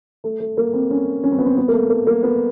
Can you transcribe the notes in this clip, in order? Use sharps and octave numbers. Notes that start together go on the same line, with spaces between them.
A3
A3
A#3
C4
C#4
C#4
C4
B3
C4
B3
A#3
A3
A#3
A#3
B3